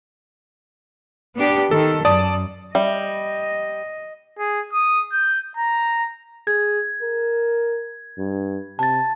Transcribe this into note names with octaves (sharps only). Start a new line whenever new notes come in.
B3 D4 G4
D#3 A4
F#2 D5 A5 D#6
G3 D#5 E5
G#4
D#6
G6
A#5
G#4 G#6
A#4
G2
C3 A5 A6